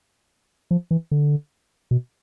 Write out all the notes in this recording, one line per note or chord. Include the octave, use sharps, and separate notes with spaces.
F3
E3
D3
B2